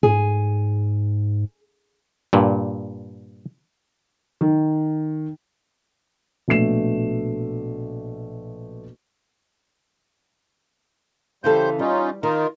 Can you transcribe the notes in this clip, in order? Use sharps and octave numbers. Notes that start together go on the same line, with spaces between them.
G#2 G#4
G2 A#2
D#3
A#1 B2 A3 C7 E7
C#3 E3 G3 A4 C5 G6
G3 C#4 D#4 F4
D#3 D#4 F4 A#4